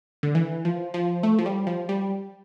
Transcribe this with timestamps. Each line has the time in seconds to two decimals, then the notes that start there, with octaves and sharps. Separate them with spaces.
0.23 D3
0.35 E3
0.65 F3
0.94 F3
1.23 A3
1.39 F3
1.46 G3
1.67 F3
1.89 G3